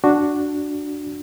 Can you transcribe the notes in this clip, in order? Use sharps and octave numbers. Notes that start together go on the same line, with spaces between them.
D4 F#4